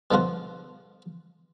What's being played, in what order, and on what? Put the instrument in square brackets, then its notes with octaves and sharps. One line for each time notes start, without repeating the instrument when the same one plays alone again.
[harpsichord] B2 D3 F3 F4 F#4